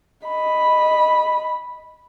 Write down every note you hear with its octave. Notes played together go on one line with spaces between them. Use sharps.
D#5 B5